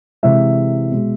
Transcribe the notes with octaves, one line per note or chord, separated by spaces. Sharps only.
C3 E3 G#3 E5
B2 G#3